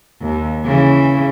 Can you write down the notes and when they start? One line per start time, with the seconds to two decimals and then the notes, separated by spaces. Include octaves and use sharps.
0.21 D#2
0.65 C#3 E3